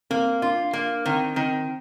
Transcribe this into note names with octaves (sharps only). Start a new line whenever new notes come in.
A#3 C4
D4 F4
A#3 D4
D#3 C4
D#3 C4